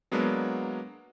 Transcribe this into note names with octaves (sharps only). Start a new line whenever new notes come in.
F#3 G#3 A#3 B3 D4